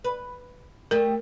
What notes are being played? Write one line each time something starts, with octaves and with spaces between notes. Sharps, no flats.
B4
A3 G4 A#4 D#5